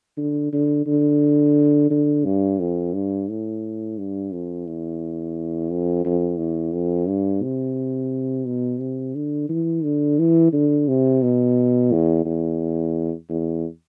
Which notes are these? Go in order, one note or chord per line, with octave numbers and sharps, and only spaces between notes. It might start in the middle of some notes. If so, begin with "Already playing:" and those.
D3
D3
D3
D3
G2
F2
G2
A2
G2
F2
E2
F2
F2
E2
F2
G2
C3
B2
C3
D3
E3
D3
E3
D3
C3
B2
E2
E2
E2